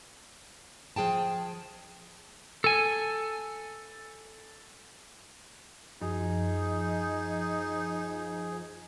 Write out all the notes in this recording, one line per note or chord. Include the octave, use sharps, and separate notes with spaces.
F3 G#4 G5 A5
A4 G#5
F#2 F3 D#4 G#4